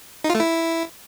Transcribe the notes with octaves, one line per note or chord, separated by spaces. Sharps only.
D#4
F4
A3
E4